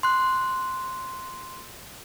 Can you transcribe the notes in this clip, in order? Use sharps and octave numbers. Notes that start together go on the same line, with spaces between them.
C6 F#6